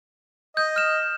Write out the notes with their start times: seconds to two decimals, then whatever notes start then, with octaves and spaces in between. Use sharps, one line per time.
0.57 D#5 G6
0.76 F6 E7